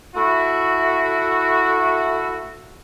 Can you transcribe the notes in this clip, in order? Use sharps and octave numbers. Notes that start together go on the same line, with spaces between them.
A3 E4 F#4